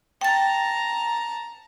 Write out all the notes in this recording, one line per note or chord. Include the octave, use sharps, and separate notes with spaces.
G5 A5 A#5 A6